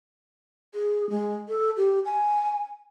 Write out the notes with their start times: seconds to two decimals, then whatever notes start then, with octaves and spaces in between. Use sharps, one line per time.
0.74 G#4
1.10 G#3
1.49 A4
1.77 G4
2.05 G#5